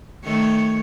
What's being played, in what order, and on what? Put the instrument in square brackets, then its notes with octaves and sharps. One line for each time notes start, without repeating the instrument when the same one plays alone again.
[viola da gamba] D#3 A3 C#5